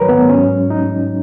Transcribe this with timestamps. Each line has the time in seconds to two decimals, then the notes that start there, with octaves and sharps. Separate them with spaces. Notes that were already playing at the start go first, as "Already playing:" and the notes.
Already playing: G#2 D#3 F#3 A#4 B4 C#5
0.09 B3
0.29 G#2 F#3 C#4
0.70 D#4